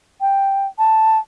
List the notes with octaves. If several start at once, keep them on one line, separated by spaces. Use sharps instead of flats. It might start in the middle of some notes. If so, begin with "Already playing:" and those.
G5
A5